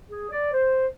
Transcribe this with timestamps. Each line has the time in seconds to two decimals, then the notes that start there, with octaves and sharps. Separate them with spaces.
0.10 G#4
0.32 D5
0.53 C5